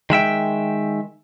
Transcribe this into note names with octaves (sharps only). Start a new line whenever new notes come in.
D#3 G#3 E5 G5